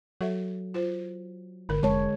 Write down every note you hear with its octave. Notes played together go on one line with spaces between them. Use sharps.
F#3 A4 E5
F4 C5
G#1 D3 A#4
F1 G#3 C#5 A5